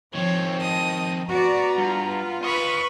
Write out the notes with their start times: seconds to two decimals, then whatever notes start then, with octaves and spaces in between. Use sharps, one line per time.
0.15 D#3 F3 C4 C#5
0.62 D#5 A5 D#6
1.30 B3 F#4 D5 A#5
1.78 G2 F4
2.44 B4 D#5 F5 B5 C#6